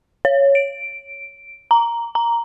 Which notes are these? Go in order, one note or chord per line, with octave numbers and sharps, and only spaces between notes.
C#5
D7
A#5
A#5